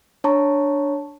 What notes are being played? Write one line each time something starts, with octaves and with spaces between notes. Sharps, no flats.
D4 C#5 A5 A#5 C#6